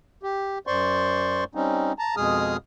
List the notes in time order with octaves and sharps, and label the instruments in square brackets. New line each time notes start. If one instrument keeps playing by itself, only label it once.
[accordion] G4
F#2 C5 D5 C6 C#6
G3 C4 C#4 D#4
A5 A#5
F2 B2 G#3 G#4 D#6 F6